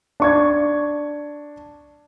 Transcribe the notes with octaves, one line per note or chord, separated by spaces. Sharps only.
D4 C#6 G#6